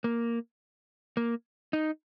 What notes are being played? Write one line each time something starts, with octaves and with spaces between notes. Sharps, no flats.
A#3
A#3
D#4